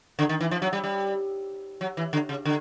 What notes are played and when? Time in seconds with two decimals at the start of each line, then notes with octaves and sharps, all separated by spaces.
0.19 D3
0.29 D#3
0.41 E3
0.51 F3
0.62 F#3
0.73 G3
0.84 G3
1.81 F#3
1.97 E3
2.13 D3
2.29 C#3
2.45 D3